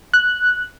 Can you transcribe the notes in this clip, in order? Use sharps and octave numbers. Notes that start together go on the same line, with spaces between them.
F#6